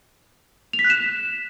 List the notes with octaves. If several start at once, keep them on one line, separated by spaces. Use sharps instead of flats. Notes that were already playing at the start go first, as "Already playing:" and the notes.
F7
B6
F#6
E7